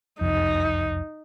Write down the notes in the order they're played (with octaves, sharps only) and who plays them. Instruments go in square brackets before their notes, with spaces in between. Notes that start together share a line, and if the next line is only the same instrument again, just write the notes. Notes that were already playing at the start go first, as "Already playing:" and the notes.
[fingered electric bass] F#1 C2 F2 [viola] D#4